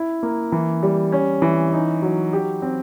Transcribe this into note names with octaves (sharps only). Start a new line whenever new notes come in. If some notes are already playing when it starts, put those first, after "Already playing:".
Already playing: E4
A#3
E3
G3
C#4
E3
D#4
F#3
G4
C4